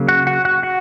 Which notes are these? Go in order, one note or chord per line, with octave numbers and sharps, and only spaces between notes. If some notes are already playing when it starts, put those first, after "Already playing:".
Already playing: C#3 F#3 A#3
F#4 F#5
F#4 F#5
F#4 F#5
F#4 F#5